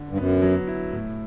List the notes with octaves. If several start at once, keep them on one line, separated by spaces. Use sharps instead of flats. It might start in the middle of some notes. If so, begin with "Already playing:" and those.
Already playing: D3
G2
F#2 B3
F#3
E4
A2